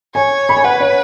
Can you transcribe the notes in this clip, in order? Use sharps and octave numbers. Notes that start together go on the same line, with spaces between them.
C#5 G#5
B5
G#5
B4 F#5
C#5